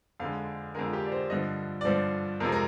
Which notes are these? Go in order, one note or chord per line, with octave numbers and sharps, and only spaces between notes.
F2 D3 G#3 F5
F2 D3 G#3 A#4
F4
G4
D5
C5
G2 D3 F3 D#5
D5
G2 D3 F3 C5
F2 C3 F3 G#3 A#4
A#4